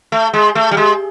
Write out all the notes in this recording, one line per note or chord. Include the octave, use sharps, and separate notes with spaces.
A3
G#3
A3
G3
G#3